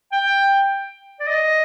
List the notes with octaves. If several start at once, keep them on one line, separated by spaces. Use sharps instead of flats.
G5
D5
D#5